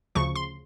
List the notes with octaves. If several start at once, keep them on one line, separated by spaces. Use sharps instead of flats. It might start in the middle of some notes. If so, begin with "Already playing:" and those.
D2 C#3 F3 C#6
C6